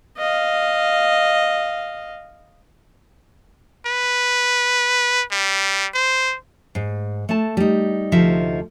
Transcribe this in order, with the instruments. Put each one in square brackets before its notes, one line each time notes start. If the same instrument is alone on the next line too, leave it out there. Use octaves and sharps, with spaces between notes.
[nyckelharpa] D#5 F5
[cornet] B4
G3
C5
[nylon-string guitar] G#2
A3 A5
G3 D#4
D2 C3 F3 D#4 E5